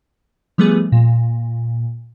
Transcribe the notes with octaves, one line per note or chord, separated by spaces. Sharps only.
F3 G3 A3 B3 G#4 B4
A#2